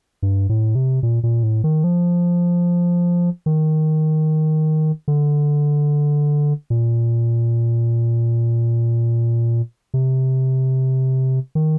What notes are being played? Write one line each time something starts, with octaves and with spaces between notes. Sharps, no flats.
G2
A2
C3
A#2
A#2
A2
D#3
F3
D#3
D3
A#2
C3
D#3